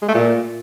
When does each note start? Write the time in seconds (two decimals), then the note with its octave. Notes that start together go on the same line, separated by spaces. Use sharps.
0.02 G#3
0.08 A3
0.14 A#2